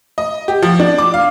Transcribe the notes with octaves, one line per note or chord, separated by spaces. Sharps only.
D#5
G4
F3
D4
D6
F5